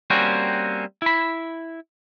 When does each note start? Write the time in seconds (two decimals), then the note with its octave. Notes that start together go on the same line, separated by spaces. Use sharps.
0.10 G3 A#3 C4 C#4 F#4
1.02 E4 B5